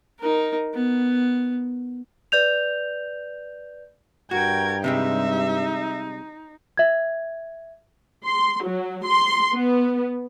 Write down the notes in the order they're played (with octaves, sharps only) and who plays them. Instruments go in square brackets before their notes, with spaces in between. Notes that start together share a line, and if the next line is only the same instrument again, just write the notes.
[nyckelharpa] D#4 A#4
B3
[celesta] B4 D5 G6 F7
[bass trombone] G2 [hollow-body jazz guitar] F#4 [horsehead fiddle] A#4 G5 [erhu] G#6
[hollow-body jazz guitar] C3 G3 G#3 [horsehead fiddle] D#4 [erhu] E5
[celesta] E5 G#6
[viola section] C6
F#3
C6
B3